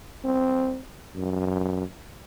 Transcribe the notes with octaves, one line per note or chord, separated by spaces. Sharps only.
C4
F#2